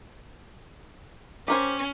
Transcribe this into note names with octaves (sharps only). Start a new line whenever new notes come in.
C#4 G4 A#4 C5